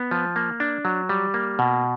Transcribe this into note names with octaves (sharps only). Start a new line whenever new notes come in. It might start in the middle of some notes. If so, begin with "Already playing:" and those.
Already playing: B3
F3
A#3
D4
F#3
G3
A#3
B2